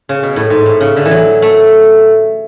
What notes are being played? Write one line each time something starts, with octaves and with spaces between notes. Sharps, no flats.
C#3
B2
A2
G#2
A2
C#3
D3
E3
F#3
A3